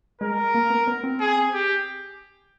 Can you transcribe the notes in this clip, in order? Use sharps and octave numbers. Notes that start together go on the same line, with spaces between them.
G#3 A#4
A#3
B3
B3
C4
G#4
G4